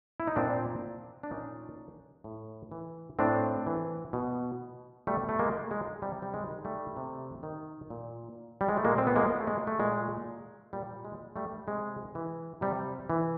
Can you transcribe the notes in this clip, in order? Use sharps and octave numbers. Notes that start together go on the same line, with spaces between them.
E4
D#4
A#2 C4 D4
D4
A#2 C#4 D#4
A2
E3
A2 C4 D4
E3
B2
B2 G3 A3
A3
G#3 A#3
G#3
C3 G3
G3
G#3
D#3
G3 A3
C3
D#3
A#2
G3
G#3
A3
A#2 G#3 A#3
C4
B3
G#3 A#3
A3
G#3
A3
A#2 G#3
A#2 G3
G#3
G3 A3
C3 G#3
E3
C3 G3
E3